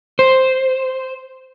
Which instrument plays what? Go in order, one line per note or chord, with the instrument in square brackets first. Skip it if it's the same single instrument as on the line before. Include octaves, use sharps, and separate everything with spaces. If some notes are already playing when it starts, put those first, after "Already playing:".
[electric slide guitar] C5